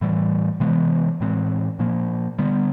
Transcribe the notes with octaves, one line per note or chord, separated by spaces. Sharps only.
A2 E3 G3
C3 E3 G#3 B3
A2 E3 G#3 C4
A#2 F3 A#3
D3 G3 B3